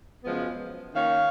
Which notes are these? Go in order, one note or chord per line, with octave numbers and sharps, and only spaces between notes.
F#2 C#3 F3 G#3 B3
D#3 A#3 C#4 C#5 F5